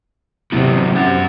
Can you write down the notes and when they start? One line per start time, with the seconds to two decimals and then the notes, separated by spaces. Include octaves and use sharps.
0.52 C3 F#3 B3 E4
0.95 C#4 F#5